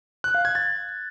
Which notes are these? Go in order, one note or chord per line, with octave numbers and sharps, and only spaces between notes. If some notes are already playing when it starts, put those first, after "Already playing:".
F#6
F5
G#6
A6